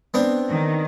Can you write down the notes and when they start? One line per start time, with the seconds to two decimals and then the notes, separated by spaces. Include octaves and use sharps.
0.14 B3 C4 D4
0.49 D#3